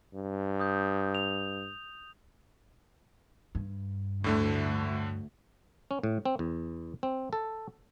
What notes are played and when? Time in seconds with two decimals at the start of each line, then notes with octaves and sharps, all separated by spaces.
0.14 G2
0.60 D#6 G6
1.15 F7
3.55 G2
4.24 D2 A2 D3 A3
5.91 C#4
6.03 A2
6.25 C4
6.39 E2
7.03 C4
7.33 A4